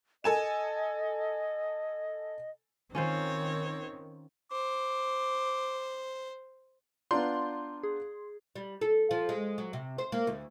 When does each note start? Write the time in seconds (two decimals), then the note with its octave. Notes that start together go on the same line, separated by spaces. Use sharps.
0.24 A4 D#5 G#5 E7
2.95 D#3 C4 C#4 F4 C5 C#5
4.52 C5 D6
7.11 B3 D4 F4 D5 A#5 C6 G6
7.83 G#4
8.56 G3
8.81 A4
9.11 F3
9.29 G#3
9.58 F#3
9.73 C3
9.98 C5
10.12 A#3
10.27 D2